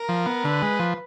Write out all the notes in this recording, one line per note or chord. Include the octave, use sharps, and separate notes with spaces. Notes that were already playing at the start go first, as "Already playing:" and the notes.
Already playing: A#4
F3
B3
D3 B4
G#3
F3